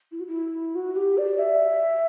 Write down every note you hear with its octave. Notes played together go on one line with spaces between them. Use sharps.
E4
F#4
E4
F#4
G4
D5
E5